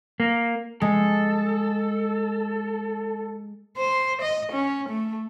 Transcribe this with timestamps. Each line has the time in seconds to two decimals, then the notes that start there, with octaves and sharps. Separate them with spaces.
0.20 A#3
0.82 G#3 A4
3.77 C5
4.22 D#5
4.52 C#4
4.89 A3